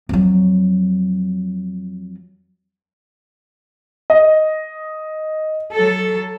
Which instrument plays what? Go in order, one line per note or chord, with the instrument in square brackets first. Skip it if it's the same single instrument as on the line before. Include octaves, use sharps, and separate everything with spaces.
[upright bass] F2 F#3
[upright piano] D#5
[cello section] F#3 A4